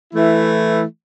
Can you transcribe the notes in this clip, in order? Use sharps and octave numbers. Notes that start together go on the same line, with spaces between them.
E3 A3 E4